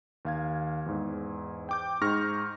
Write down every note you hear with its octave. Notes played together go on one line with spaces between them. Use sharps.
D#2 F5 G#6
E2 G#2
G5 D6 G6
G#2 D#4 G#4 C#6 F6 A#6